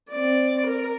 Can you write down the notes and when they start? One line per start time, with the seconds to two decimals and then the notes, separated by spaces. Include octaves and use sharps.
0.11 C4 D5
0.67 A#4